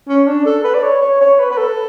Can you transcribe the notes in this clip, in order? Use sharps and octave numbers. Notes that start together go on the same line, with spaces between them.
C#4
D4
A4
B4
D5
C#5
C#5
C#5
B4
B4
A4